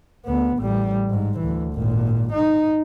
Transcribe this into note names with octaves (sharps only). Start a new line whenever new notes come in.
D2 B3
A1 G3
G#2
D2 E3
G#1 A#2
D#4